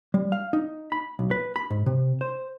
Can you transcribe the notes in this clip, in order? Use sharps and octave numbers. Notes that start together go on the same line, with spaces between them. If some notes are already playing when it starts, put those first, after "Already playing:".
G3
F5
D#4
B5
B1
B4
B5
G#2
C3
C5